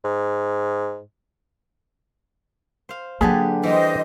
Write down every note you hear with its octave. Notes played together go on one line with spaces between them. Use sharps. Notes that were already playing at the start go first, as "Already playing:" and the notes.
G#2
C5 F5
D3 F#3 A#3 G4 G#4 B4 G#5 A5
E3 G3 C5 D#5